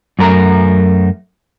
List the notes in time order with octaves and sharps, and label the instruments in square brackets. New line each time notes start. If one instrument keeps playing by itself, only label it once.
[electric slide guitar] F#2 A3 A#4 A#5